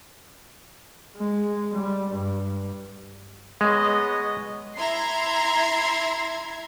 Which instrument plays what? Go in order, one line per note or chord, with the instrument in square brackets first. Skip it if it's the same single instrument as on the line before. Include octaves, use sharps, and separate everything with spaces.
[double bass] G#3
G3
G2
[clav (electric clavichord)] G#3 [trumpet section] B3 C#5 D#5
[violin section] E4 E5 A#5 C6 G#6 C7